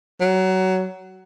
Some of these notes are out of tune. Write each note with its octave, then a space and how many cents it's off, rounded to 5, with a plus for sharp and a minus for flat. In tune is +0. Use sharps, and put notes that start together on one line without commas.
F#3 +20